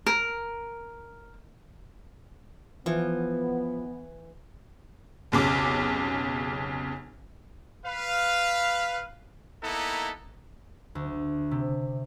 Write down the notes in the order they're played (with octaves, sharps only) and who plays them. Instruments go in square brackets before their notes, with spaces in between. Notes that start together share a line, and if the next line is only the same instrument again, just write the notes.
[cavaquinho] A#4
[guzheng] E3 [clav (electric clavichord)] F3 [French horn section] B3
[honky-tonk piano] F1 B1 C#3 D6
[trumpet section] B4 F5
A#3 B3 D#4 E4 A4 A#5
[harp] D2
C3